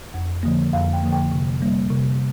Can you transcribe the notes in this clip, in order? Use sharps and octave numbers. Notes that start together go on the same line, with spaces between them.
F2
D3 F3 A#3
F2 F5
G5
D3 F3 A#3
G5
C3
G3 A#3
C3